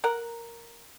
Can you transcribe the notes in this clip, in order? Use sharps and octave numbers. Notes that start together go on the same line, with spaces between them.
A#4 F#5